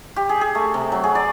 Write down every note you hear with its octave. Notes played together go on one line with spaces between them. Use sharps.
G4
G#4
G#4
A3
C3
F#3
G#4
D5